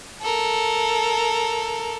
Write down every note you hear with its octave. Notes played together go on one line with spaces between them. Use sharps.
A4 A#4